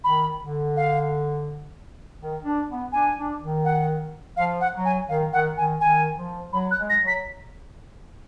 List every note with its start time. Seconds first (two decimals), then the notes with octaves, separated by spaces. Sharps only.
0.04 D#3 B5
0.41 D3
0.76 F5
2.20 D#3
2.44 D4
2.69 B3
2.92 D4 G#5
3.17 D4
3.41 D#3
3.65 F#5
4.37 F3 F5
4.60 F#5
4.73 F#3
4.85 G#5
5.09 D#3 F5
5.32 D#3 F#5
5.57 D#3 G#5
5.81 D#3 G#5
6.17 F3
6.52 F#3 B5
6.71 F#6
6.78 G#3
6.90 A#6
7.01 F#3
7.07 B6